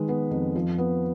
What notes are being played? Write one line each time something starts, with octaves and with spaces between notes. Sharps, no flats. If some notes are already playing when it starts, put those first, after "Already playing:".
Already playing: D#3 G#3 B4
B3
F2
F3
B3